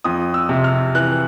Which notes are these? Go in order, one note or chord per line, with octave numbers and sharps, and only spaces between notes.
F2 D#6
E6
C3
F6
E3 F#6